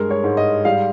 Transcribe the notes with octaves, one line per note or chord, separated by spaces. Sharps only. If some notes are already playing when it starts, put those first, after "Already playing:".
Already playing: G2 G#3 A#4
C#5
G#2
D#5
G3 F5